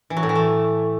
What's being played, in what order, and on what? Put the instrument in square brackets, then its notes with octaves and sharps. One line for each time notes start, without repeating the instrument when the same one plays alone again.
[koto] E3
F#3
A2
E3
A3